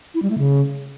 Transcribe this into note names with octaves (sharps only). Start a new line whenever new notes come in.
E4
G3
A3
C#3